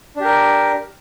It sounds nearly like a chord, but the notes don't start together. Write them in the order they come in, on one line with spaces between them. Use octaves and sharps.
D4 G4 A#4